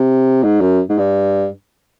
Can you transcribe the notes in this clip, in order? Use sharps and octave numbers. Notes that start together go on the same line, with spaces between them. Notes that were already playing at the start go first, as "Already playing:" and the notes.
Already playing: C3
G#2
F#2
G#2
G2